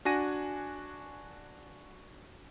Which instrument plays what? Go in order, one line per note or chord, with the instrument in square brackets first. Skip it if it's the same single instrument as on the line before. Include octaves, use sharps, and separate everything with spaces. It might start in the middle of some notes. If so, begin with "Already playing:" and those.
[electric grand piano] D4 F#4 G#5 A#6 D#7